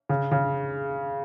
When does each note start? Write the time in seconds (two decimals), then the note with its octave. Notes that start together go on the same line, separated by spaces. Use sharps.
0.09 C#3
0.32 C#3